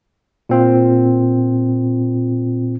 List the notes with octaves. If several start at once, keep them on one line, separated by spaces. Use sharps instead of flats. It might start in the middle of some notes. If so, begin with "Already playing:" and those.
A#2 C4 F4